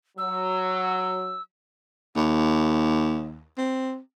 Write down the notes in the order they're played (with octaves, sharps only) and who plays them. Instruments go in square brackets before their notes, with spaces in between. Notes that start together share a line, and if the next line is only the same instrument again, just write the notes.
[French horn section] F#3 [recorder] E6
[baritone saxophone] D#2
C4